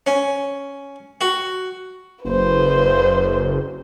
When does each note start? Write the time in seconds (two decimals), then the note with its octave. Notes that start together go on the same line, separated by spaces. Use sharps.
0.07 C#4
1.21 F#4
2.25 F#1 B4 C5